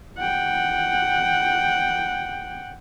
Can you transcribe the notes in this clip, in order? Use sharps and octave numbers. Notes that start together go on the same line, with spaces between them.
F#5 G5